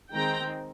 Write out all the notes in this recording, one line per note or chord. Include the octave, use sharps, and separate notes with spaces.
D#3 G#3 C4 G5 A#5